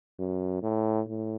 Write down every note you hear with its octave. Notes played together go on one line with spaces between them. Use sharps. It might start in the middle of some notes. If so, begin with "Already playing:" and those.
F#2
A2
A2